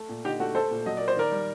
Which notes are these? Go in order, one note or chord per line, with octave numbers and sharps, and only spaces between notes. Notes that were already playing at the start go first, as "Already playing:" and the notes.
Already playing: A3
A#2
D3 D#4 G4
A3 F#4
A3 A4 C5
A#2
F#3 D#5
A#3 D5
C5
D#3 A#4 D5
G3